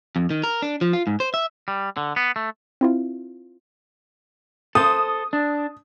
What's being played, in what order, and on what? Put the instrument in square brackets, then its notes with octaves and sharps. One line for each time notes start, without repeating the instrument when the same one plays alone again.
[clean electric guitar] F2
D#3
A#4
D4
F3
F4
G#2
C5
E5
G3
D3
B3
A3
[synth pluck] C4 E4 F4
[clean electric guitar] A4 C5 [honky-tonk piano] D#6
[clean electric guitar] D4